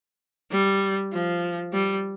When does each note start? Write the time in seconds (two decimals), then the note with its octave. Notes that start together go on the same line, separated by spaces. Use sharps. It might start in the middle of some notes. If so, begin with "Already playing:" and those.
0.51 G3
1.12 F3
1.73 G3